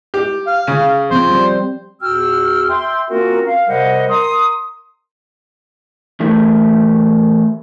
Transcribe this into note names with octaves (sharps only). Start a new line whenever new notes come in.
G4
F5
C#3
F3 C4 C5
G3
E2 A#2 F#4 G5 E6 F6
E5 G5 C6
A#3 C4 C#4 F4 F#4 A#4
F5
C3 G3 A#4 C5 D#5 F#5
A#4 C6 D#6
E3 A3 G4 A#4